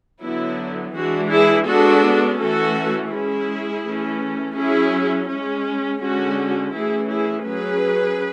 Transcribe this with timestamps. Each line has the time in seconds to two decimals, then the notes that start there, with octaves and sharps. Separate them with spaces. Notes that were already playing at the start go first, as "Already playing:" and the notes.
0.21 D3 F#3 B3 E4
0.95 E3 G#3 D4 F#4
1.31 E4 G#4
1.66 G#3 B3 D4 F#4 A4
2.39 E3 A3 C#4 F#4 A4
3.12 G#3 C#4 E4 G#4
3.85 E3 A3 C#4
4.57 F#3 C#4 E4 G#4
5.30 G#3 C#4
6.02 D3 G#3 C#4 F#4
6.75 E3 A3 C#4 E4 G#4
7.11 E4 G#4
7.48 F#3 C#4 G#4 B4